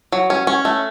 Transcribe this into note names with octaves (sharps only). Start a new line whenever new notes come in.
F#3
C#4
C#4
A3